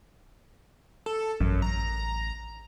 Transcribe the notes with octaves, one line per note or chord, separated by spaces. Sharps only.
A4
A1 F#2
A#5